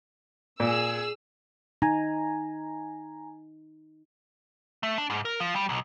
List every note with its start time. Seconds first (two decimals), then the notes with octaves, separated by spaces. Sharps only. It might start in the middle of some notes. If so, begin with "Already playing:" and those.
0.60 A#2 G#4 E6
1.82 D#4 G#5 A#5
4.83 A3
4.98 D4
5.10 G#2
5.25 A#4
5.40 F3
5.56 G3
5.69 B1